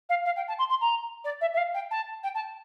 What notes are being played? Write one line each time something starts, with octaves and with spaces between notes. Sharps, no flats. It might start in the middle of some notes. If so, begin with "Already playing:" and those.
F5
F5
G5
A5
C6
C6
A#5
D5
E5
E5
F5
G5
A5
G5
A5